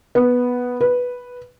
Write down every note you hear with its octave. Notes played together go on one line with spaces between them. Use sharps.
B3
B4